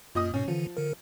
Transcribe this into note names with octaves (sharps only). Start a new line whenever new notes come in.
F#2 A#2 D#5 D#6
G#2 B2 C#4
D3 E3 F3
D3 A#4